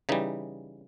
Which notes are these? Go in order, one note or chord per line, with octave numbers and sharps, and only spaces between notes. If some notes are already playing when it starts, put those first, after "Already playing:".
C#3 E3 G3 D#4